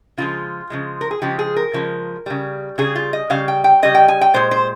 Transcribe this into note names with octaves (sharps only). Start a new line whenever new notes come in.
C#3 F3 G#3 F4
C#3 F3 G#3
A#4
G#4
C#3 F3 G#3 G4
G#4
A#4
C#3 F3 G#3
C#3 G3
C#3 G3 G#4
F4
D#5
C#3 G3 F5
G5
G5
C#3 G3 D#5
G5
G#5
G5
A#2 G#3 C5
C5